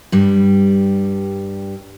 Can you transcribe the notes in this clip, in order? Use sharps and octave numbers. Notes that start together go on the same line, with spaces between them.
G2 G3